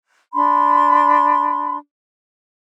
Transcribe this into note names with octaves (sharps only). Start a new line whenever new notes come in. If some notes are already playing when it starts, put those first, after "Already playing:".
D4 B5 C6